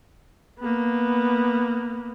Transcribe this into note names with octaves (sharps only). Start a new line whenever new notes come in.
A#3 B3